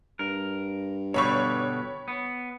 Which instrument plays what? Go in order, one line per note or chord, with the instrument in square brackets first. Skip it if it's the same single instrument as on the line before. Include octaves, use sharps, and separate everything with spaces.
[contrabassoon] G2 [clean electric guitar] A#4
[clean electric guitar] B2 D3 G3 [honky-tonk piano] C#5 B5 C#6
[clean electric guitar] B3